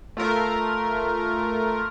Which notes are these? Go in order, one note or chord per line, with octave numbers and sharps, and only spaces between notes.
A3 F4 A#4